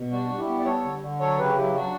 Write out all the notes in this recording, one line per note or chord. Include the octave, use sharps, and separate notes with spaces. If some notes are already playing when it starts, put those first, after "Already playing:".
Already playing: B2
G3 D4 F#4
G3
E4 G4
B3
D5
G3 A4 C#5
D3
D3
F#3 A4 C#5
C#3 G4 B4
F#3 E4 G4
F#3 D4 F#4